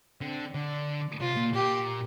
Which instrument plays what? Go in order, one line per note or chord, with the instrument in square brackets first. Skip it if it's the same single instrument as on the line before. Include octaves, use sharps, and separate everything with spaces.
[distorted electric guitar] D3 [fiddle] C4
[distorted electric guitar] D3 [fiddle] D4
[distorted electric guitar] C3 [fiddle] F4
[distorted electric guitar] A#2
[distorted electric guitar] A#2 [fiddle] G4